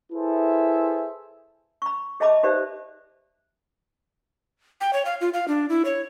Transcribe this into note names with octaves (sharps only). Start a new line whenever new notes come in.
E4 G#4 A4 B4 C5 E5
B5 C#6
G#4 D#5 E5 A5 B5 D6
D#4 G4 B4 C5 D5 E5
G5
C#5
F5
F4
F5
D4
E4
C#5